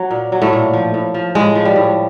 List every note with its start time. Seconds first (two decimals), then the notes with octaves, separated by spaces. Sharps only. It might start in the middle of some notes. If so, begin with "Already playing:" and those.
Already playing: F#3
0.11 A#2
0.32 F#3
0.42 A2 A3
0.53 A#2
0.73 F3
0.94 A2
1.14 F3
1.35 A2 G#3
1.55 F3
1.65 G3
1.76 A2